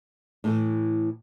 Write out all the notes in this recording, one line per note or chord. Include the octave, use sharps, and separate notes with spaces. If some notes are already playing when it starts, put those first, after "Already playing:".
A2 E3 A3